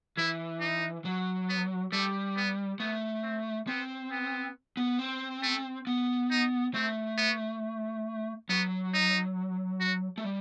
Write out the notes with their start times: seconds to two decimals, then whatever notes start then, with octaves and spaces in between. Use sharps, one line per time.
0.17 E3 E4
0.60 D#4
1.05 F#3
1.49 B3
1.92 G3 A3
2.36 B3
2.80 A3 B3
3.23 C4
3.67 B3 C4
4.12 B3
4.77 B3
4.99 C4
5.42 A3
5.87 B3
6.31 D#4
6.74 A3 C4
7.18 B3
8.49 F#3 B3
8.94 D#4
9.80 F#4
10.18 A3
10.24 G3